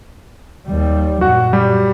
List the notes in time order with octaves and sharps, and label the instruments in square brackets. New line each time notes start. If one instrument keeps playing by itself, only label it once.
[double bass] D#2 G3
[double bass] F#2 A#2 [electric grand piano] F#4 F#5
[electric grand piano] G3 G4